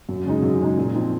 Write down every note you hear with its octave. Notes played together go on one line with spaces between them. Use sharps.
F#2
C#3 G#3 D#4
F#2
C#3 G#3 D#4
A#2
F3 C4 D#4